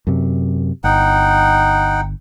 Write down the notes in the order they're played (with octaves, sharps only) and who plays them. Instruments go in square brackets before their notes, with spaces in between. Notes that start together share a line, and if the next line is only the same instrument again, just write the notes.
[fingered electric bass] F#2 C3
[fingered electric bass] G1 [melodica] D#4 F#5 G5